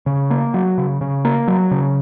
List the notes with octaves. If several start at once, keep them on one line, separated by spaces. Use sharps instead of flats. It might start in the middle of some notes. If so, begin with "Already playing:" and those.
C#3
A#3
F#3
C#3
C#3
A#3
F#3
C#3